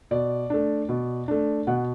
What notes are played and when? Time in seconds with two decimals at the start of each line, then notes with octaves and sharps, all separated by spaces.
0.11 B2 D5
0.50 A3 D4
0.89 B2
1.28 A3 D4
1.67 B2 F#5